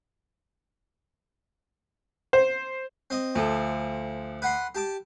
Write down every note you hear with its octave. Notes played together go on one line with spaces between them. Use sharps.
C5
C4 D#5
D2 F3 A4
B4 F#5 C6
G4 A5 D6